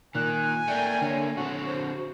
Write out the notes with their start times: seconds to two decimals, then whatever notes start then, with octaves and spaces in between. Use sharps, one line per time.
0.15 A#2 D#3 G#5 F#6
0.68 A3 A#3 D5 G5
1.01 D3 C#5
1.37 D3 C4 F#4
1.66 C5